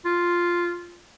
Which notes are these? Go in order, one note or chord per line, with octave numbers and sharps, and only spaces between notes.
F4